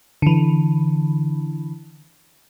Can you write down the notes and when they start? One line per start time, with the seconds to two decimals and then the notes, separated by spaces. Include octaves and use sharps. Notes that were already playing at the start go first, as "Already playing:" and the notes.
0.22 D3 E3